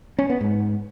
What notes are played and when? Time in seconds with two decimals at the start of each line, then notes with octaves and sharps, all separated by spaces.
0.19 C#4
0.30 B3
0.41 G#2